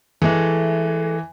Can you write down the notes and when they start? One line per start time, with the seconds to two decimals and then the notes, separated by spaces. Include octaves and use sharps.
0.22 E3 G#3 A3